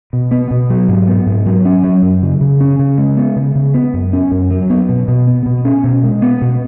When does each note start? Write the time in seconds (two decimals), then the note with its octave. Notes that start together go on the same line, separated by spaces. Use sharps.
0.13 B2
0.31 B3
0.51 B2
0.70 F#3
0.89 G#2
1.08 B3
1.27 G#2
1.46 F#3
1.65 C#4
1.83 F#3
2.02 F#2
2.22 C#3
2.41 C#3
2.60 C#4
2.79 C#3
2.98 G#3
3.17 B3
3.36 C#3
3.56 C#3
3.74 B3
3.94 F#2
4.13 C#4
4.31 F#2
4.51 F#3
4.70 B3
4.89 B2
5.08 B2
5.27 B3
5.46 B2
5.65 C#4
5.84 B2
6.04 G#3
6.22 B3
6.42 B2